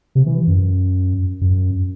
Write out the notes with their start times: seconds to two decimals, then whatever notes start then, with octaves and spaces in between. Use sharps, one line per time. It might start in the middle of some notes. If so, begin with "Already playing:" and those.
0.15 C3
0.26 E3
0.47 F#2
1.41 F#2